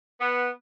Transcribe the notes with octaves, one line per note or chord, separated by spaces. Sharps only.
B3